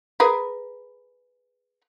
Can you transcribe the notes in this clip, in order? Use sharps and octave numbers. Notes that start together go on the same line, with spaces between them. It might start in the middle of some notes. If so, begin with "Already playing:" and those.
G#4 A#4 B4